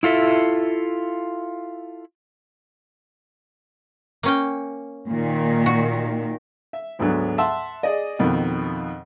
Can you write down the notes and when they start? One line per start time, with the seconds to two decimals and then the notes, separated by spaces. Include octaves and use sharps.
0.03 E4 F4 A4 E5
4.23 A#3 C#4 G5
5.08 A#2 D#3
5.66 F#4
6.73 E5
6.99 D2 G#2 D3 F#3 B3
7.38 E5 F#5 A5 C6 E6
7.83 G#4 D5 D#5
8.19 F2 B2 D#3